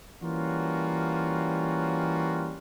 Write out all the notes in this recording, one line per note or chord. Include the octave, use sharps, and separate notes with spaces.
E3 G3 A#3 C#4 F4 F#4